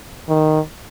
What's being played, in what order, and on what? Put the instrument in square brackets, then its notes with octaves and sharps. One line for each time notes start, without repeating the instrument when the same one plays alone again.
[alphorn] D#3